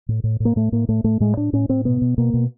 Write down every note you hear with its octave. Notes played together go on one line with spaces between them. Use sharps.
A2
A2
A2
A#3
A2 A3
A2 A#3
A2 A3
A2 A3
A2 G#3
A2 D4
A2 C#4
A2 C4
B2 B3
B2
B2 A#3
B2